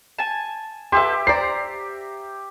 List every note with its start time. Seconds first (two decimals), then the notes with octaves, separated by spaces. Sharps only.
0.19 G#5 A5
0.92 F#4 G4 A4 B4 E5 C6
1.27 C5 D5 A#5 C7